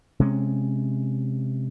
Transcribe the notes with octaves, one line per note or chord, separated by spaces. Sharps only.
C3 G#3 C#4